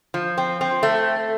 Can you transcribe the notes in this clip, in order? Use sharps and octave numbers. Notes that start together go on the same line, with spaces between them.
F3
C4
C4
A3